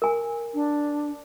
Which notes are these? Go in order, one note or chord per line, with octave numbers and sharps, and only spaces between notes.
A#4 G#5
D4